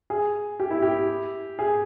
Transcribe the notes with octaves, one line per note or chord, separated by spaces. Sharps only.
G#4
G4
E4
G4
G#4